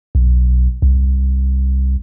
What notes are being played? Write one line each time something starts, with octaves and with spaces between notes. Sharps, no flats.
B1
C2